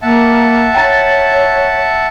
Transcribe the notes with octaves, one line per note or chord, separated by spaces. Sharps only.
A#3 E5 F#5 A5
C#5 G5 A#5 A6